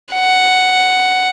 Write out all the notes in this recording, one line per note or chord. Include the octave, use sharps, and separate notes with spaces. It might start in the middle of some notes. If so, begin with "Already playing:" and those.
F#5